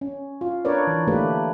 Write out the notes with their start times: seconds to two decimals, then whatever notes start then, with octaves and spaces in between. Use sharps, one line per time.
0.01 C#4
0.41 F4
0.65 D4 A#4 B4 C#5 D5
0.87 E3
1.08 D3 A3 A#3 D4 G4 B4